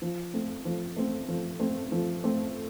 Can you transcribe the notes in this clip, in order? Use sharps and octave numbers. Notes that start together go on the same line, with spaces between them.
F3
A3 C4
F3
A3 C4
F3
A3 C4
F3
A3 C4